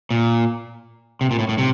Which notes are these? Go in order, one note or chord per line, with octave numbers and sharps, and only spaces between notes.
A#2
C3
A#2
A2
A2
C3